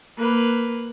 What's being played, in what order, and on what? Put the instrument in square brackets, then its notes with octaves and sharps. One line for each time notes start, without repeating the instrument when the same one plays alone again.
[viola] A#3 B4